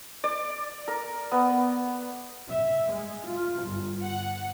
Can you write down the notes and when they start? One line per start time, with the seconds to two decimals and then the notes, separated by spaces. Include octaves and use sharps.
0.24 D5
0.88 A#4
1.32 B3
2.50 E5
2.92 G#3
3.29 F4
3.65 G1
4.04 F#5